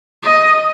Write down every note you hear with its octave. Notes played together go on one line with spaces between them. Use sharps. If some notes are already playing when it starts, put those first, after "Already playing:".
D#5